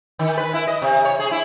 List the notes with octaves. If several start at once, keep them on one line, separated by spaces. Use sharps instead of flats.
D#3
B4
E4
D#5
C3
C#5
G#4
E4